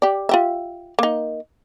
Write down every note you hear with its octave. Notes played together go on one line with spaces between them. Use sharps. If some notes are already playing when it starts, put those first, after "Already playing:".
G4 D5
F4 G4 E5
A#3 D#4